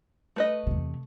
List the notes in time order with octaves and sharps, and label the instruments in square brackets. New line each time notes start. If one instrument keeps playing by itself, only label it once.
[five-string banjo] A3 B4 D#5
[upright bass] E2 C3